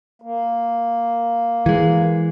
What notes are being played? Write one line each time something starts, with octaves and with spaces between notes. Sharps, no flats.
A#3
E3 G#3